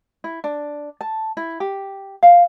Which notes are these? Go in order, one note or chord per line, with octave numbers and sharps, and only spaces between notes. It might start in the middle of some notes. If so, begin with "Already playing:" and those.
E4
D4
A5
E4
G4
F5